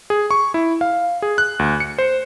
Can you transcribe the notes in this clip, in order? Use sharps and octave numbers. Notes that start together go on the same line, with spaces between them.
G#4
C#6
E4
F5
G#4
F#6
D2
C#7
C5